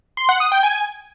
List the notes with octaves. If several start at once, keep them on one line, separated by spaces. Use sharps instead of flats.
C6
F#5
D#6
G5
G#5